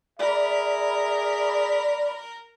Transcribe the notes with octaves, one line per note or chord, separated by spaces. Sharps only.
G#4 A#4 D5 E5 B5